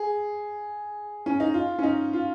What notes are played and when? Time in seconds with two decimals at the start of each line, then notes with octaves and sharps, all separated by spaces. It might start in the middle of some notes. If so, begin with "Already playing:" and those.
Already playing: G#4
1.26 C#4
1.40 D#4
1.54 F4
1.79 C#4
1.83 D#4
2.13 F4